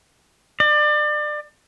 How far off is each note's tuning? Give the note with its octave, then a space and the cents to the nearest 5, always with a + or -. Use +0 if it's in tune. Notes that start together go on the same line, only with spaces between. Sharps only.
D5 +30